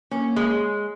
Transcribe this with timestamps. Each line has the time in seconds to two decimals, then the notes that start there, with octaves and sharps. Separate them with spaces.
0.11 A#3 C#4
0.36 G#3